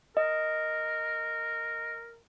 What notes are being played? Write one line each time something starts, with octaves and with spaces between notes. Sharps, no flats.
A#4 D#5